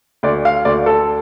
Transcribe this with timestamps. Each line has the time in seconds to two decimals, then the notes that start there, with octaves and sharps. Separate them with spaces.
0.23 D2 D5
0.45 F5
0.65 D2 D5
0.86 A4